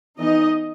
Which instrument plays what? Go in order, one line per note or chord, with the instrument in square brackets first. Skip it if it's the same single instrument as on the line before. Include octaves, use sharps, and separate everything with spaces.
[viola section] E3 B3 D#4 D#5